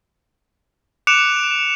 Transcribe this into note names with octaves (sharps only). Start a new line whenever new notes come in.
D6 F#6 C#7 D7 E7 F7